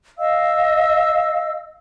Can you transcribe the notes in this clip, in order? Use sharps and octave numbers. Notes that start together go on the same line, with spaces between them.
D#5 F5 E6